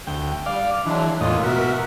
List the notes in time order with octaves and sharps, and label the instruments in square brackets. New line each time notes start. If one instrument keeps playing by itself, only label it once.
[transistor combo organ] D2 G5
[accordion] G3 [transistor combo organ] D5 F5
[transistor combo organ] E3 [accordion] F#3 G#3 D4
[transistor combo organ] E2 A2 D#5 [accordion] G#3 A#3 F4
[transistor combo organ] B2 F#4 [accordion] A#4 E5